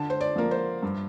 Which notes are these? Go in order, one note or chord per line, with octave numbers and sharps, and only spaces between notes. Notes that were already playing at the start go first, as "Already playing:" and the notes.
Already playing: D3 A5
C5
D5
F3 A#3
C5
G2